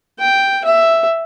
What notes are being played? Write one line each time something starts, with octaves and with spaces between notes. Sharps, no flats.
G5
E5